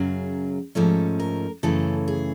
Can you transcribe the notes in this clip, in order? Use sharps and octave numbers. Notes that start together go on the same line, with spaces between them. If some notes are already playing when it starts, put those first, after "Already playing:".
Already playing: F#2 C#3 F#3 G#4
G#2 F3 A3 C#4 A4
A#4
F#2 C#3 E3 A3 A4
G#4